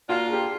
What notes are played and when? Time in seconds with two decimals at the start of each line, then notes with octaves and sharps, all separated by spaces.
0.09 A#3 D4 F4 F#4
0.28 G#4
0.33 G4